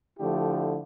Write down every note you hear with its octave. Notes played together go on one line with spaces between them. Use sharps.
D3 F3 A3 E4 G4